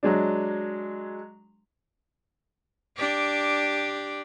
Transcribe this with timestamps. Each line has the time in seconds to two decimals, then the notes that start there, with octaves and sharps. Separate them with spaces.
0.03 F#3 G#3 D4
2.97 D4 G4